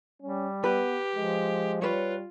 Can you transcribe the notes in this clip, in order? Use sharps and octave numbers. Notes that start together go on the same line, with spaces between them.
G3 C#4
B3 G4 B4
F3 G#3
G3 F4 B4 C#5